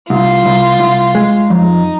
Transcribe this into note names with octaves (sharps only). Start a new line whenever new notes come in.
C2 F4
C2
C2
G#3
F2 D#4